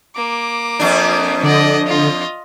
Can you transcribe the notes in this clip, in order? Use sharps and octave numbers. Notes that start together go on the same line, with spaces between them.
A#3 D6
F2 D4
D3 D5 D#5
F4 D#5